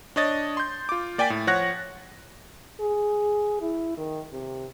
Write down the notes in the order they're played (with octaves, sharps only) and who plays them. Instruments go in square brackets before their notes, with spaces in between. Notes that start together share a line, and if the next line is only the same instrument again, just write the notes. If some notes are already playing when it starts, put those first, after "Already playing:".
[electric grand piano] D4 C#5 D#5 A6
C6 G6
F4 D6
A#3 D5 G5 G#5 A6 B6
A2
F3 C#5 F#5 F#6 A#6
[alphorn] G#4
E4
D#3
C3